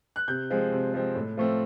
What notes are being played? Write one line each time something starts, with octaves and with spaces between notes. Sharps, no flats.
F#6
C3 G6
F3 G#3 C4
C3
F3 G#3 C4
A2
F3 A3 C4